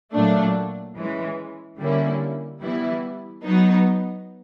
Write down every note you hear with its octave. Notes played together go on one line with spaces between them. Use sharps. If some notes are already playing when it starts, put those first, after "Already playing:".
A#2 F#3 A3 D4
E3 G#3 C#4
D3 G3 A#3 C#4 E4
E3 G3 B3 E4
F#3 B3 D#4